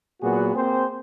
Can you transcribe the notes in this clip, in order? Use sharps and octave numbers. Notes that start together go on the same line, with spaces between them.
A#2 F#3 A#3 B3 F#4 G#4
A#3 C4 G#4 C5